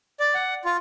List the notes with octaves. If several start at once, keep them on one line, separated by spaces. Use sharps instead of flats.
D5
F#5
F4